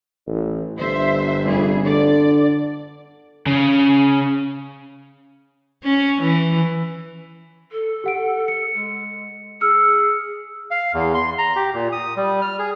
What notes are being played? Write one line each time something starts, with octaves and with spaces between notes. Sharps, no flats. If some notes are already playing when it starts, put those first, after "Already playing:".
A1
G1 C5 E5
F1 G3 G#4
D3 D5
C#3
C#4
E3
A4
G4 F#5 D7
C#7
G#3
G#4 E6 F6 C#7
F5
E2
C6
A#5
G4
A#2
D#6
G3
F6
G#4